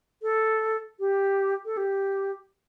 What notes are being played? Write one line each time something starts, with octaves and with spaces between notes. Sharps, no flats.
A4
G4
A4
G4